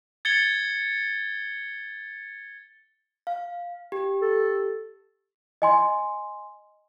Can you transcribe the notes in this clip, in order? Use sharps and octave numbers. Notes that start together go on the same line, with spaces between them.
G#6 A6 C#7 G7
F5
G4
A4
D#5 G#5 C6